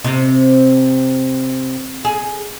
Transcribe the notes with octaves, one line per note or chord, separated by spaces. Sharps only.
C3
G#4